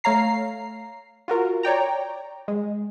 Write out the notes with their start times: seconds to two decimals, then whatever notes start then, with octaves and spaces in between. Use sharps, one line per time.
0.04 A3 C#5 F5 A#5 C7
1.28 F4 F#4 A#4
1.63 C#5 D5 G5 A#5
2.48 G#3